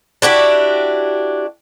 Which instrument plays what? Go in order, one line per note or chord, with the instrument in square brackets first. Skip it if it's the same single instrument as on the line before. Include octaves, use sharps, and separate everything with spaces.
[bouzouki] D4 E4 F#4 G4